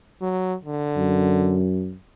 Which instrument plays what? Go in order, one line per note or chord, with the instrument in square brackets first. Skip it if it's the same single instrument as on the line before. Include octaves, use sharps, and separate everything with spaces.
[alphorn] F#3
D3
[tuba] F#2